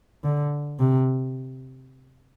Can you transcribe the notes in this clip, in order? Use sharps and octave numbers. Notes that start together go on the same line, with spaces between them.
D3
C3